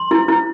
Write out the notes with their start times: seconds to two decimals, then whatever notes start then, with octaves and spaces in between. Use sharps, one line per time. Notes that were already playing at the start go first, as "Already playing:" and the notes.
Already playing: C6
0.11 E4
0.28 E4